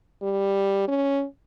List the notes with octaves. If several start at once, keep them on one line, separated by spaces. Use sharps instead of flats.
G3
C#4